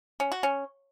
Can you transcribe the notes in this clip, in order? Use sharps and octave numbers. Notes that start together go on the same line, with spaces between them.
C#4
F#4
C#4